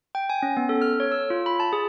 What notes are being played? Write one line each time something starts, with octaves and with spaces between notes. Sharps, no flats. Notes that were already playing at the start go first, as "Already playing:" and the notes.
G5
G#5
C#4
B3
A4
F6
C#5
E6
F4
B5
A5
G#4